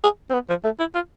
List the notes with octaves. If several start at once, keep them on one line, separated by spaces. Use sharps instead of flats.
G#4
C4
B3
F3
A3
E4
F4